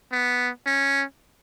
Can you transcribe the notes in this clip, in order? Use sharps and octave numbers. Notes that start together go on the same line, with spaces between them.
B3
C#4